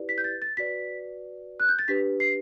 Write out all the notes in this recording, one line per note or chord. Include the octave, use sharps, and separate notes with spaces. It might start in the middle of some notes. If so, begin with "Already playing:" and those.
Already playing: E4 G4 B4 D5
B6
G6
A6
A6
F#4 B4 D5 B6
F#6
G6
A6
D4 G4 B4 B6
C7